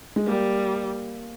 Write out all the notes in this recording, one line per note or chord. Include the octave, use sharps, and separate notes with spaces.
G#3
G3 A#3